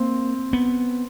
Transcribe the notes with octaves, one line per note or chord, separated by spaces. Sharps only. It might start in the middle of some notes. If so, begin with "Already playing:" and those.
Already playing: A#3 C4
B3